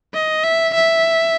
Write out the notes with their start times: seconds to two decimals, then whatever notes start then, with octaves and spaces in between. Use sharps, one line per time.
0.14 D#5
0.44 E5
0.75 E5